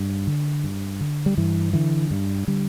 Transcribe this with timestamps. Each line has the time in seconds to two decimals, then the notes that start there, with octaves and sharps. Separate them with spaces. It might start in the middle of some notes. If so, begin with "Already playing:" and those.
Already playing: G2
0.27 D3
0.64 G2
1.01 D3
1.26 G3
1.37 G2 E3
1.73 D3 E3
2.11 G2
2.47 D3 G3